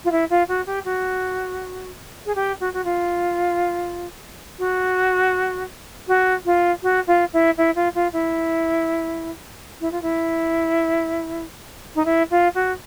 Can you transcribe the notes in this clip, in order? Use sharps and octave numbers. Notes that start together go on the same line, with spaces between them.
F4
E4
F4
F#4
G4
F#4
G#4
G4
F#4
F#4
F4
F#4
F#4
F4
F#4
F4
E4
E4
F4
F4
E4
E4
F4
E4
D#4
E4
F4
F#4